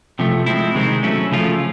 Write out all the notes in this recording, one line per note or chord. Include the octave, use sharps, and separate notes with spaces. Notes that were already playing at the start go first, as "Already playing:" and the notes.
C3 F3 A3
F3 G#3 C4 E4
C3 D#3 G#3 C4
F#3 A3 C#4 E4
C#3 F3 A3 C#4 F4